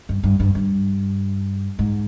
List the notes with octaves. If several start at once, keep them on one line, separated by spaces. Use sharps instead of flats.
G2
G2
G2
G2
G#2